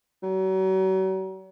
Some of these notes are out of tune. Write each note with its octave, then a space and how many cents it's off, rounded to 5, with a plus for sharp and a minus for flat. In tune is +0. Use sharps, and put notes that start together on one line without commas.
F#3 +40